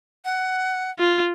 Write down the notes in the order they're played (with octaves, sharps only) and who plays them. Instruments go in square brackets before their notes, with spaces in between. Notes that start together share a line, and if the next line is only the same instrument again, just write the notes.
[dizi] F#5
[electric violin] F4